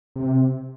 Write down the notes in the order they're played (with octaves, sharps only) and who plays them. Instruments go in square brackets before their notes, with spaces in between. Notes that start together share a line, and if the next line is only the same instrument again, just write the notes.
[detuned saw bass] C3